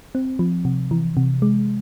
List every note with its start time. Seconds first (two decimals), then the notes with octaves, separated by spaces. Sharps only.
0.15 C4
0.39 F3
0.65 C3
0.91 E3
1.17 C3
1.42 G#3